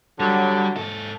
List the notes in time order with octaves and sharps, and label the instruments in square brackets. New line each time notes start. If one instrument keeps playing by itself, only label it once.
[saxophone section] D3 F#3 [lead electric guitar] G3
[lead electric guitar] G#2 A4